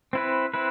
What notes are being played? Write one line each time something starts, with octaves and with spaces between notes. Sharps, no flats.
C4 E4 B4
C4 E4 B4